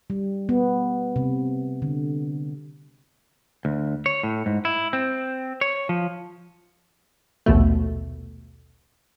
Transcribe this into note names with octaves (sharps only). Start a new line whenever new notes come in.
G3
B3
C3
D3
D2
C#5
A2
G#2
E4
C4
C#5
F3
A#1 D#2 B2 A3